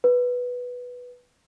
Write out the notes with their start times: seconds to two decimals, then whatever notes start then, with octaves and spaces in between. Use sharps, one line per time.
0.04 B4